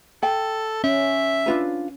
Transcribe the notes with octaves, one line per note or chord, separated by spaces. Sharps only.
A4 G5
C#4 E5
D4 F4 B4